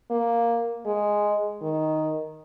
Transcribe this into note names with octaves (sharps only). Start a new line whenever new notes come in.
A#3
G#3
D#3